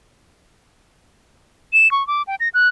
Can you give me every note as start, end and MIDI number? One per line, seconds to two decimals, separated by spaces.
1.73 1.91 100
1.91 2.06 85
2.07 2.22 86
2.27 2.35 79
2.40 2.49 94
2.54 2.68 90